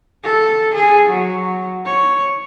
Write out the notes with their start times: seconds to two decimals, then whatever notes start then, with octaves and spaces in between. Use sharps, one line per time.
0.24 A4
0.74 G#4
1.09 F#3
1.85 C#5